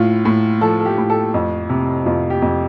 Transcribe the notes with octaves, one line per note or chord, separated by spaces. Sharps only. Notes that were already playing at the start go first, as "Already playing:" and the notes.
Already playing: A2 F4
A2
F3 A4
A4
G4
A2
A4
F2
C3
F2 F4
G4
F2